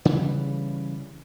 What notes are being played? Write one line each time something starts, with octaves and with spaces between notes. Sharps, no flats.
C#3 E3 G3